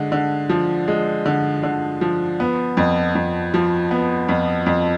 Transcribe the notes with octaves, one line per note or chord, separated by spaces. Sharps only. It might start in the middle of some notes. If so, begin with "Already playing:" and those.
Already playing: D3 G#3
D3
F3
G#3
D3
D3
F3
B3
F2
F2
F3
B3
F2
F2